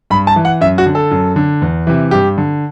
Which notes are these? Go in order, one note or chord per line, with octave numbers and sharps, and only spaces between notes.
G2 B5
A5
E3
F#5
F#2 E5
F#4
D3
A4
F#2
D3
E2
C3 E3
G2 G4
D3